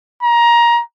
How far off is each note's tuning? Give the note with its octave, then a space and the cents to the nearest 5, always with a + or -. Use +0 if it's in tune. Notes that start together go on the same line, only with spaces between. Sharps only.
A#5 +20